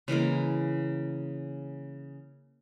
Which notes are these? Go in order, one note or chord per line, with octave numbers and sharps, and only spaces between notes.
C#3 E3 G#3 A#3